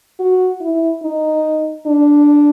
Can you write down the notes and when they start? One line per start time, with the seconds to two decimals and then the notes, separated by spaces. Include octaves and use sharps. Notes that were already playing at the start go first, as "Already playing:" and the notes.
0.19 F#4
0.61 E4
1.03 D#4
1.86 D4